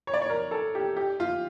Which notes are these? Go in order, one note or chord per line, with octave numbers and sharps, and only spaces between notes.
C#5
D5
C#5
A#4
A4
G4
G4
F4